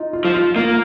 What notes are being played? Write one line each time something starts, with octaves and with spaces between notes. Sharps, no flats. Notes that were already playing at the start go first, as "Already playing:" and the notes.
Already playing: D#4 F4
F4
F3
F4
A#3 F4